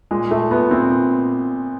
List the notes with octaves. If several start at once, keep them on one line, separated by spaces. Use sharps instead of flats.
A#2 G#3
A#2 A3
A#2 B3
A#2 C4